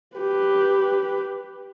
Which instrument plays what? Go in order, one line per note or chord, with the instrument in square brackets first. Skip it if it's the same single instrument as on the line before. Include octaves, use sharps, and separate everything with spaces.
[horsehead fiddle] G4 B4